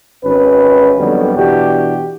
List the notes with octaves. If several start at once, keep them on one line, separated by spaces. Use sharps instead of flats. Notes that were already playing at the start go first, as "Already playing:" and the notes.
G#1 C#4 B4
F2 D3 D#3 F#3 G3 B3
B2 E3 D4 F#4 G4